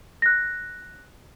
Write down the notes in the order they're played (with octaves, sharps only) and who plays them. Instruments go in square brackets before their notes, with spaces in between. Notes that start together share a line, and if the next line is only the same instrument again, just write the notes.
[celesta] F#6 A#6